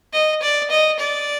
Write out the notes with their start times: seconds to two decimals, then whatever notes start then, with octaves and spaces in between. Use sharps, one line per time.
0.13 D#5
0.42 D5
0.70 D#5
1.00 D5